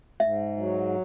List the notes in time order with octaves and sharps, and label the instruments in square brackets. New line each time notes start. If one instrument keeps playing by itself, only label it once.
[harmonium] G#2 [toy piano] E5
[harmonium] F#3